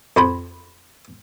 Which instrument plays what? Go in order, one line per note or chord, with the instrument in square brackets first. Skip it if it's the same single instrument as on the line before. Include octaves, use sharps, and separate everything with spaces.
[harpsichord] F2 C5 B5